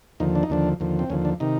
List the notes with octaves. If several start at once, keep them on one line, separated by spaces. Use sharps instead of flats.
D#2 D3 F3 D#4
D4
D#4
D#2 D3 F3 D4
D#2 D3 F3
C4
D#2 D3 F3 C#4
D4
C3 D#3 D#4